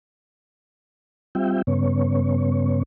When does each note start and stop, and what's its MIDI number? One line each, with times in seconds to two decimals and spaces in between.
1.35 1.62 55
1.35 1.62 60
1.35 1.62 65
1.35 1.62 76
1.35 1.62 79
1.67 2.83 43
1.67 2.83 49
1.67 2.83 59
1.67 2.83 73